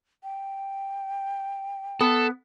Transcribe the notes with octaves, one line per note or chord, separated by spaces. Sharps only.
G5
B3 A4